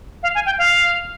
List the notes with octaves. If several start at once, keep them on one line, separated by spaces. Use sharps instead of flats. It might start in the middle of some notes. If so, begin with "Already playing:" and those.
F5
G#5
G5
F5